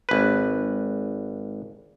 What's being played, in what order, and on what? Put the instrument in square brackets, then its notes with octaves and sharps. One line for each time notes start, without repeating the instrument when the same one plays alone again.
[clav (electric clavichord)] G#1 B4